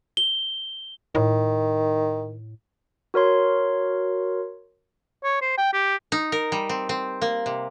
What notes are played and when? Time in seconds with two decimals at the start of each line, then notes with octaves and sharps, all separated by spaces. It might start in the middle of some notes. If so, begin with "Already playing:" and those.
0.17 G7
1.15 A2 D#3
3.14 F#4 A#4 C#5 C6
5.24 C#5
5.41 C5
5.58 G5
5.73 G4
6.12 D#4
6.32 A#4
6.52 G3
6.69 C4
6.89 C4
7.22 A#3
7.46 C3